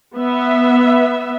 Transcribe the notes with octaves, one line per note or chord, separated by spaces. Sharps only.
B3 E5